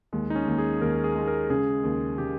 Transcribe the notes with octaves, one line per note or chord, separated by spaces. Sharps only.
D#2 G#3
D#4
C#4
D#2
G#4
D#2 A#4
G#4
G#3
A#4
C#3 G#4
D#2
C#3 G4